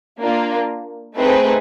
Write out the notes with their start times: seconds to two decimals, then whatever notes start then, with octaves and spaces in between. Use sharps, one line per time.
0.21 A#3 D4 F4
1.16 A3 C4 D#4 G#4 B4